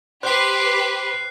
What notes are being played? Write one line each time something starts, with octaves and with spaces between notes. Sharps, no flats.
G4 B4 C5 C6 F#6 C7